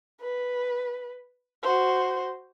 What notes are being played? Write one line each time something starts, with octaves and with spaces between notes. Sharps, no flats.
B4
F#4 C5